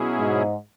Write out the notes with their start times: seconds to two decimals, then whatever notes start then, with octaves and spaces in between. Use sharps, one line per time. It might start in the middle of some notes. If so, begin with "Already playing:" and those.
Already playing: B2 F#3 C#4 E4 G#4
0.18 G#2